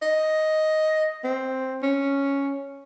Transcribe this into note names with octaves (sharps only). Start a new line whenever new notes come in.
D#5
C4
C#4